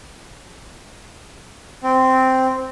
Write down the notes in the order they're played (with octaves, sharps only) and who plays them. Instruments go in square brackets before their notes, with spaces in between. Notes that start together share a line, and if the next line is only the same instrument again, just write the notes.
[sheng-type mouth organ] C4